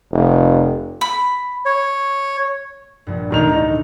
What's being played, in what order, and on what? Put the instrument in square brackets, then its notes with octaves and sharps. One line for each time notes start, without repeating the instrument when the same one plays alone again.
[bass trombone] F1
[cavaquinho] B5
[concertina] C#5
[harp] A#1 G2
[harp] A1 D2 B2 [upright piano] G2 D#3 F7
[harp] E3 D4 [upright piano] D#4